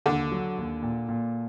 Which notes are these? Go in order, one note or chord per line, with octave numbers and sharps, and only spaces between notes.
D#2 D3
F#3
D#2
A#2
A#2